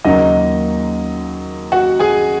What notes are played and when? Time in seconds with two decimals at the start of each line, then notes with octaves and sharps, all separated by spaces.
0.05 D#2 C#3 F#3 A#3 D#4 D#5
1.72 F#4 F#5
1.99 G#4 G#5